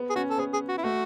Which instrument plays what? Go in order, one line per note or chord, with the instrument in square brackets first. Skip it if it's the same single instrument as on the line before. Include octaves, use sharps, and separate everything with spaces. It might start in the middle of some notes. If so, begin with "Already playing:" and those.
Already playing: [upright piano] B3
[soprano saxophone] G#4
[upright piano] C#4 [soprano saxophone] F#4
[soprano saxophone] A4
[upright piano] B3 [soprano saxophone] G#4
[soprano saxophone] G#4
F#4
E4
[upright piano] A3 [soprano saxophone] F#4